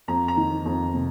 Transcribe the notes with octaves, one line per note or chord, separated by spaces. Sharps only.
F2 A#5
A#5
D#3
F2
C3